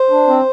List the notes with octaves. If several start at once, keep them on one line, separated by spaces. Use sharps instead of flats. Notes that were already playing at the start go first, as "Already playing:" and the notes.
Already playing: C5
D4
C4